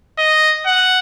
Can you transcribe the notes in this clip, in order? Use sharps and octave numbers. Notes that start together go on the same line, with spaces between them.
D#5
F#5